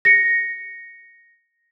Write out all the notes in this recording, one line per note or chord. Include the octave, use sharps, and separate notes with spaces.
A#6 C#7